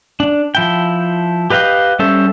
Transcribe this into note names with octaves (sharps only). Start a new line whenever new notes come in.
D4
F3 E4 G5
G4 B4 D#5 F5 G5
G3 C#4 A4 C5 E5